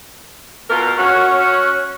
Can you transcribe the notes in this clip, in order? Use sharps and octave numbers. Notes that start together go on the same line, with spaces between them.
B2 F4 A#4
C#4 F#4